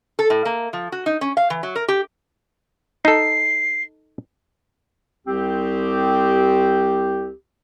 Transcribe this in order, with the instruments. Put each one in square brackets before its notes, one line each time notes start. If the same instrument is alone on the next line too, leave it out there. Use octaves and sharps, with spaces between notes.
[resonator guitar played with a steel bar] A4
A2
A#3
F3
F#4
D#4
C#4
F5
E3
F#3
A#4
G4
[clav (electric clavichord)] D#4 A4 [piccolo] C7
[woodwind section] C2 C4 G4